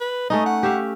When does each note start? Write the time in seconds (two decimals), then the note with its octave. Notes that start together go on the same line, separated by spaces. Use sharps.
0.01 B4
0.30 A3 C#4 D#4 D#5
0.46 F#5
0.63 G4 E5 F5